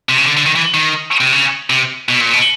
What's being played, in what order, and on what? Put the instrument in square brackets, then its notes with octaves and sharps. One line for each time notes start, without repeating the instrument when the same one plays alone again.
[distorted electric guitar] C3
C#3
D3
D3
D#3
E3
D#3
C3
C#3
C3
B2
A#2
B2